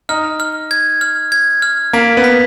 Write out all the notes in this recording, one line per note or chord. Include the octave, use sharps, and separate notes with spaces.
D#4 F6
F6
G#6
F6
G#6
F6
A#3 B6
B3
B6